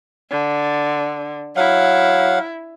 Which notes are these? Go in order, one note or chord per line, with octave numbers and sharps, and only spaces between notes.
D3
F#3 E4 F5 F#5